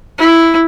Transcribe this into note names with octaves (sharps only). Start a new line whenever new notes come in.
E4